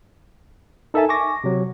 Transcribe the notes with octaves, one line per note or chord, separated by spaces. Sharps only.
D#4 A4 A#4 E5 G#5 A5
G#5 C#6 D6 A#6
C3 F#3